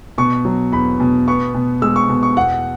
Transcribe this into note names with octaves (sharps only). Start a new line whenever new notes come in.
B2 C#6
F#3
E2 B5
B2
B3 C#6
B2
G#3 E6
C#6
B2
C#6
E2 F#5